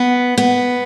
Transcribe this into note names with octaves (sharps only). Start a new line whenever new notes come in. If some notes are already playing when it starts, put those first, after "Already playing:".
Already playing: B3
B3